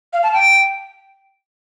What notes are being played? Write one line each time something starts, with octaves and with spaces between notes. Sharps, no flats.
F5
A5
G5